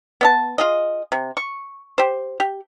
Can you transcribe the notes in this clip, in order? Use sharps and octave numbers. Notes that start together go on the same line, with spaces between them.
B3 D#5 A5
F4 G#4 D#5
C3
C#6
G4 C5
G4